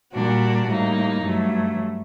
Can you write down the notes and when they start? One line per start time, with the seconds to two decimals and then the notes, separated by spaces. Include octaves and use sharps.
0.13 A#2 G3 A#3 D4 F#4
0.68 A2 G3 A#3 D#4
1.23 G2 F#3 A3